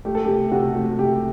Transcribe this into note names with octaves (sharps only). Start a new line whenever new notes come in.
A3 G4
A4
G4
C3
C3 F#4
A3
C3 G4